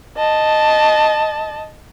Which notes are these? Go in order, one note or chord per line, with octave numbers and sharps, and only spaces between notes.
D#5 A5